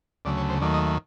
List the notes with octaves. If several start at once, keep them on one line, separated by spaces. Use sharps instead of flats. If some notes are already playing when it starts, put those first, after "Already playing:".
D2 C#3 F#3 A3 D5
C#5
C5
D#2 D#3 F#3 A3 D5
D#5
E5